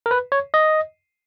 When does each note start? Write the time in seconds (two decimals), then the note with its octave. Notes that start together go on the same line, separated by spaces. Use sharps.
0.06 A#4
0.11 B4
0.32 C#5
0.54 D#5